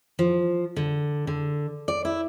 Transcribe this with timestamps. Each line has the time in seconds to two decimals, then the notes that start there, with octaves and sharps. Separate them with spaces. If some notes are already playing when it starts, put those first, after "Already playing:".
0.19 F3
0.76 D3
1.27 D3
1.88 D5
2.05 E4